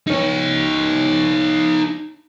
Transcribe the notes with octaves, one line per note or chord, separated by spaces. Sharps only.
D#4 C#5